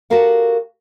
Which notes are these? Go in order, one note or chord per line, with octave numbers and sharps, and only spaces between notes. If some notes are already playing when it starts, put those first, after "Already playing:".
F#4 G4 A4 A#4 F5 F#5